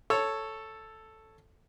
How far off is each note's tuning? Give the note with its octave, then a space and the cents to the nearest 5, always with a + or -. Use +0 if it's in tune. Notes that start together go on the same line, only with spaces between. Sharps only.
A4 +0 C#5 +0